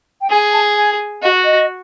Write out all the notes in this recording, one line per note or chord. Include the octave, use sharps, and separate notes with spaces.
G5
G#4 G#5
A5
G#5
F#4 D#5
D#5